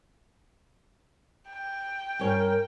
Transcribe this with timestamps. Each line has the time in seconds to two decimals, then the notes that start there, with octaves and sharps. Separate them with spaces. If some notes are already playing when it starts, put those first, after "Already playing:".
1.50 G5
2.19 G2 C#4 A#4 C#5